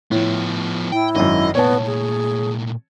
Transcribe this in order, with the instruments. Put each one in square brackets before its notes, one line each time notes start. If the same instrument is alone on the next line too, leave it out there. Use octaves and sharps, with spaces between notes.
[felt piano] A2 [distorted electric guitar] F3 B3
[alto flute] E4 [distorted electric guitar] G5
[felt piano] G#1 F#2 [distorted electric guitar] D#5
[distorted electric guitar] A#2 A3 [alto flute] B3 [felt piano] C#5 A5
[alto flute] G#4